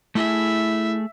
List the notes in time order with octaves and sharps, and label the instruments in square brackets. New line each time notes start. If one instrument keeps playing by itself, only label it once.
[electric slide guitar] A3 G#4 [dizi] E4 [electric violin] E5